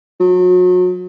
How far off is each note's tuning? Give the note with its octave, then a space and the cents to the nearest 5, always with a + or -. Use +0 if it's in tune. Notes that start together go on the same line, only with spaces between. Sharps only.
F#3 -35